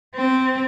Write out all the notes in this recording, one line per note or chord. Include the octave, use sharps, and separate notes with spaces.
C4